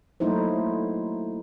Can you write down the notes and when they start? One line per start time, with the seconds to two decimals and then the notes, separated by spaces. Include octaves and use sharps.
0.20 F#3 A3 A#3 D#4 E4 C5